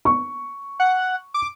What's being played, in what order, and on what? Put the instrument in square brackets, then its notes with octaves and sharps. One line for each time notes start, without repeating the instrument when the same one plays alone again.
[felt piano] C#6
[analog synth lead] F#5
D6